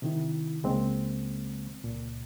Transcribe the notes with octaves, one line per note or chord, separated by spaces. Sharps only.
C3 D#3 E4
C#2 C#3 G#3 A#3 C4
C#2 A#2